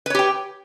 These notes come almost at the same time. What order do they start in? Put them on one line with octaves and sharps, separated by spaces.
B4 C#5 G4 G5